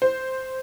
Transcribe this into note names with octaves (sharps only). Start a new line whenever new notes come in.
C5